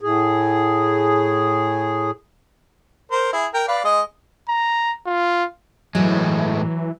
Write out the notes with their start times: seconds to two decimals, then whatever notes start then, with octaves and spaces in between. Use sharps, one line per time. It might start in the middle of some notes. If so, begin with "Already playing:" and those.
0.01 A2 G#4
3.12 A#4 C5
3.33 E4 G#4
3.54 A#4 G5
3.68 B4 D5 F5
3.84 G#3 D#5
4.49 A#5
5.06 F4
5.95 A2 E3 F#3 G#3